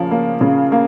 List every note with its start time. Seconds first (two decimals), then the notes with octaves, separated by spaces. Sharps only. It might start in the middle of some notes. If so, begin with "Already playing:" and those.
Already playing: C#3 F3 A#3 C#4
0.11 A#3
0.41 C#3
0.72 A#3